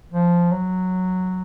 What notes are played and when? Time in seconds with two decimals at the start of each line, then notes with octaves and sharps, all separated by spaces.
0.12 F3
0.51 F#3